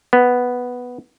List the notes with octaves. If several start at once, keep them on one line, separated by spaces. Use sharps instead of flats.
B3